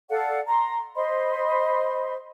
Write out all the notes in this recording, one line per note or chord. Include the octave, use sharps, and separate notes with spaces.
A4 D5 F5 F#5
A#5 C6
C5 D#5 B5 C6